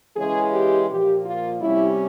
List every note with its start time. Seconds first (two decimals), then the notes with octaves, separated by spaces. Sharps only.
0.16 C#3 E3 G#3 C#4 G#4
0.52 G4
0.88 A#2 F3 A#3 G4
1.25 F4
1.61 C3 G3 C#4 E4